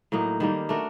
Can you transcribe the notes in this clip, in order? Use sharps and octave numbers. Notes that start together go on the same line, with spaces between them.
A2 F#3 A#3 D#4
D#3 G3 A#3
A3 D4 F#4 A#4